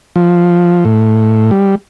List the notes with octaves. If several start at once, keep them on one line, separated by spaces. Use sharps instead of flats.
F3
A2
G3